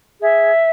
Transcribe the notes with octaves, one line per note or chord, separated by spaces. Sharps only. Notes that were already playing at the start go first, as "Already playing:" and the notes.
G#4 E5